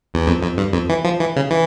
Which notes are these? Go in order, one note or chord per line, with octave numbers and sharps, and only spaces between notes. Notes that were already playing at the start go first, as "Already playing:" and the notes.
E2
F2
F2
G2
F2
E3
F3
E3
C#3
E3